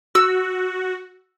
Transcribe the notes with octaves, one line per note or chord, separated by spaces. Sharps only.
F#4 E6